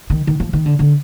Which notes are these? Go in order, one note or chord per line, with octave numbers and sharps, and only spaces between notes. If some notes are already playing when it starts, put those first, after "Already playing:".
D#3
D#3
F3
D#3
D3
D3